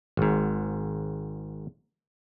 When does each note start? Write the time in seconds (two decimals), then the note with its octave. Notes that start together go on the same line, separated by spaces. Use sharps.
0.17 G#1 G#2